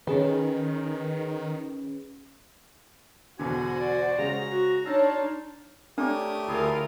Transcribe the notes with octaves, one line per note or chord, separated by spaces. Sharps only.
D#3 C#4 G#4 B4
E2 B2 D3 F#4 C5 G#5
D5
C#3 G#3 A#5
F#4
D4 D#4 F4 C#5 A5 E6
A3 D4 G4 A#4 C#5 D5 D#6
D2 E4 F4 G#4 A#4